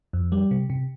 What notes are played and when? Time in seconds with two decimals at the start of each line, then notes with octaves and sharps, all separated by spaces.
0.13 F2
0.32 G3
0.51 C3
0.70 C3